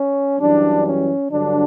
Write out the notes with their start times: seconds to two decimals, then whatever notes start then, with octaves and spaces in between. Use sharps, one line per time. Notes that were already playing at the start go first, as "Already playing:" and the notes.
Already playing: C#4
0.40 F#2 E3 G3 D4
0.86 C#4
1.31 G2 D3 F#3 D4